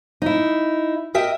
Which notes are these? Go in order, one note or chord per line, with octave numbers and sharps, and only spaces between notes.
D#4 E4
A#4 D#5 E5 G5